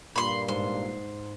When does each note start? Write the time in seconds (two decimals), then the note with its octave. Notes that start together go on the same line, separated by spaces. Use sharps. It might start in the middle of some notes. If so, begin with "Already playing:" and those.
0.16 G2 A#2 B5 C6
0.48 G#2 C6